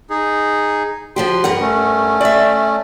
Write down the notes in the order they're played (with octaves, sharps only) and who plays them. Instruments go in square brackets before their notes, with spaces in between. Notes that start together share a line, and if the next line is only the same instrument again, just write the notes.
[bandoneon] D#4 G#4
[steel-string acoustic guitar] F3 F#4 G4 [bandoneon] C6
[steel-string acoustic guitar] G2 A#4 F#5
[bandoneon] A3 C#4
[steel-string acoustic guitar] D5 E5